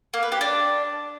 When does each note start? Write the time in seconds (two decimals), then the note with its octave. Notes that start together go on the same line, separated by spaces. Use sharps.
0.14 A#3
0.23 B4
0.32 G4
0.41 D4